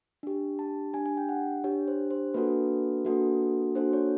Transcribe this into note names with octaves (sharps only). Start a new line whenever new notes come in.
D4 G4
A5
D4 G4 G#5
G#5
G5
F#5
D4 G4 C#5
C5
C5
A#3 D4 F#4 A4 B4
A#3 D4 F#4 A4
A#3 D4 F#4 A4 C5
C#5